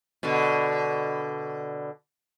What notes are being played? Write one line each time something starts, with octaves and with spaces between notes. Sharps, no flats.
B2 D3